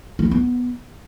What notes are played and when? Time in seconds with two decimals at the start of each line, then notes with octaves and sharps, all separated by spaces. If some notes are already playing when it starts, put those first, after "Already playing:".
0.19 A#3
0.25 E4
0.31 B3